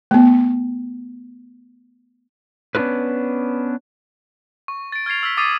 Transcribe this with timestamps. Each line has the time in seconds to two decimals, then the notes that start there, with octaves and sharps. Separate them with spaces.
0.11 A3 B3
2.75 B3 C#4 D4 F4 A#4 B4
4.68 C#6
4.92 A6 D7
5.06 F6 G#6 A6 C7 F7
5.23 E6 F6 B6
5.37 D6 D#6 A6 C7 D#7